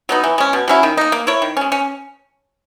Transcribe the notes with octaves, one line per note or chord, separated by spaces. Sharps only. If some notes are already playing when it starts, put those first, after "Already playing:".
F#3 B3 D#4
E3
G#3 C#4
B2
F#3 C#4 E4
D#3
A#3 D#4
A#3
E4 A#4 C#5
D#3
G#3 C#4
C#4